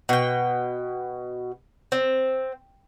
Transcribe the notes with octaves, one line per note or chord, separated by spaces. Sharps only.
B2 G5
C4